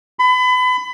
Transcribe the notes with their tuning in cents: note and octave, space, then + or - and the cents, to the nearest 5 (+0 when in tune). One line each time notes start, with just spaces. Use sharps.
B5 +30